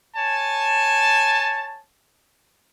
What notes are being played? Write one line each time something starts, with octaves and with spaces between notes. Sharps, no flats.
C#5 G#5 A5